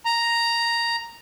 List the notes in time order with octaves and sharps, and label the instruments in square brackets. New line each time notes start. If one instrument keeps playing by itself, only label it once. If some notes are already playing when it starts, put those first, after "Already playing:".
[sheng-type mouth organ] A#5